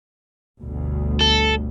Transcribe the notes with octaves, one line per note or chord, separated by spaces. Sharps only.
G1 D2 B2
A4